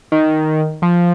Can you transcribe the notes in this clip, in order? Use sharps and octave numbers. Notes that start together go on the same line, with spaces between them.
D#3
F3